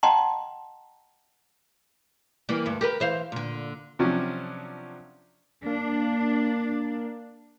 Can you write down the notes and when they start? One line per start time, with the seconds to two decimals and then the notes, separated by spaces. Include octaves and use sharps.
0.03 D#5 F#5 G5 A5 A#5 C6
2.49 E3 G3 A#3
2.66 D2 G2
2.81 G4 A#4 B4
3.00 E3 C5 F5
3.32 A#2 D3
3.99 C3 F3 F#3 C#4 D4
5.66 A#3 D4